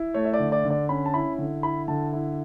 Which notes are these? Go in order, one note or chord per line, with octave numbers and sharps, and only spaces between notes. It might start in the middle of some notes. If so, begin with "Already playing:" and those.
Already playing: E4
A3 C#5
E5
D5
D3
D5
D3
D5
C#4 B5
A5
E4 B5
D3
E4 B5
D3 A5
E4